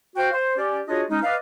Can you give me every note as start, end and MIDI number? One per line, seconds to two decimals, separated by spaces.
0.16 0.31 66
0.16 0.31 72
0.16 0.31 77
0.16 0.31 79
0.33 0.56 72
0.57 0.80 61
0.57 0.80 67
0.57 0.80 74
0.88 1.03 62
0.88 1.03 65
0.88 1.03 66
0.88 1.03 68
0.88 1.03 73
0.88 1.03 75
1.10 1.21 56
1.10 1.21 61
1.10 1.21 63
1.23 1.36 71
1.23 1.36 74
1.23 1.36 75
1.23 1.36 77